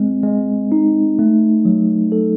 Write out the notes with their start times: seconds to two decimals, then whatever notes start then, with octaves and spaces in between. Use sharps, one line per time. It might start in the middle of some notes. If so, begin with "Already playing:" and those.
Already playing: G#3 C4
0.23 G#3
0.72 D#4
1.19 A3
1.65 F#3
2.12 A4